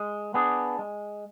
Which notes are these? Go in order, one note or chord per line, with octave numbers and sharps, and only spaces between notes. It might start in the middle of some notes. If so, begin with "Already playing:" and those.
Already playing: G#3
B3 D4 G#4
G#3